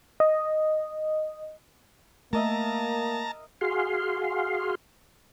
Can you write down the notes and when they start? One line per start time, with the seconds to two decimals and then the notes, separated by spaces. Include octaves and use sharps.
0.20 D#5
2.33 A3 A#3 A#4 D#5 E5 A5 A#5
3.61 F#4 G#4 F5 C6